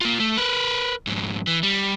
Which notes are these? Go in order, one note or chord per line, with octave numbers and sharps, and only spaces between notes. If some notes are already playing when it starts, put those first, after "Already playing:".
A#3 F4
A3
A#4 B4
F2 G#2
E3
G3